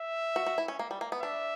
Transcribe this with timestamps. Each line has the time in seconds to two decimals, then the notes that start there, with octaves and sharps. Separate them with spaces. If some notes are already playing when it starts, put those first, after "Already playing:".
Already playing: E5
0.36 F#4
0.46 F#4
0.58 E4
0.68 C#4
0.79 A#3
0.91 G3
1.01 A#3
1.12 B3
1.22 D4 E5